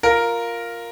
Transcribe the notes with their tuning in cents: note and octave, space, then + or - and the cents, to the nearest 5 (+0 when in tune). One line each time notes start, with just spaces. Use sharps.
F4 +0 A#4 +0